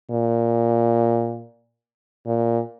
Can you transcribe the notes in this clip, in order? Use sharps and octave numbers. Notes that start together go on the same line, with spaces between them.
A#2
A#2